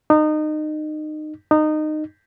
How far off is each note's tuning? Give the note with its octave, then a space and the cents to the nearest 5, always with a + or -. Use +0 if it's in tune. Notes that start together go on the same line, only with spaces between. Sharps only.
D#4 -25
D#4 -20